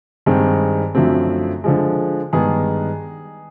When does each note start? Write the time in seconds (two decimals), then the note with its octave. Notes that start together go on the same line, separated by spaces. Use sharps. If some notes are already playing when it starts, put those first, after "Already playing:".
0.26 G2 D#3 G#3 C4
0.95 F#2 D3 F3 A3 C4
1.64 D3 F3 G#3
2.33 G2 D#3 G#3 B3 G#4